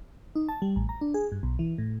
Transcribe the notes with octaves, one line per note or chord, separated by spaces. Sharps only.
D#4
A5
G3
A1
A#5
D4
G#4
G2
B1
E3
A2